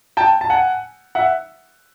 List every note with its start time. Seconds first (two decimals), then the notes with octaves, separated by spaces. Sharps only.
0.17 G5 A5
0.41 A5
0.50 F#5 G#5
1.15 E5 F#5